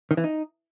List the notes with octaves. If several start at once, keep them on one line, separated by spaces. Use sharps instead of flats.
D#3
E3
D#4